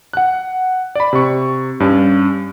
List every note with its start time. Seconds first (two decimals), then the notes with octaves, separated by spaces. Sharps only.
0.13 F#5 F#6
0.95 D5 B5
1.13 C3 C#6
1.80 G2 C#4 D4